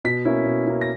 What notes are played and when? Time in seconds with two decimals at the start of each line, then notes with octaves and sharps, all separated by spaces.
0.05 B2 B6
0.25 A#3 C#4 E4
0.45 B2
0.67 A#3 C#4 E4
0.81 A#6